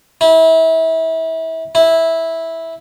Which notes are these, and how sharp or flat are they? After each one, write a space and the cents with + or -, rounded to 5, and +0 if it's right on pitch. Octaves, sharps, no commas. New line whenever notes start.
E4 -30
E4 -10